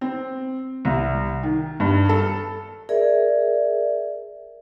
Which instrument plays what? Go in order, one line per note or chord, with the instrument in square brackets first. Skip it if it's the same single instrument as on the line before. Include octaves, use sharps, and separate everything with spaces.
[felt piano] C4
C2
D#3
G2
A4
[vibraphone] G#4 A#4 D5 E5